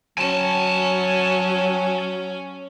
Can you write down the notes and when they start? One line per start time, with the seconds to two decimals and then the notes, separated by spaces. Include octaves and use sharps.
0.18 F#3 C#4 G#5 A5